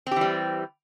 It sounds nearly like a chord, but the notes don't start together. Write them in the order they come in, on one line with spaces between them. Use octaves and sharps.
C4 G4 E3 G3